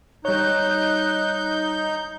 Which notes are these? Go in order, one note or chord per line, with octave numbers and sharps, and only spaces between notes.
G3 D#4 C#5 F#6 G6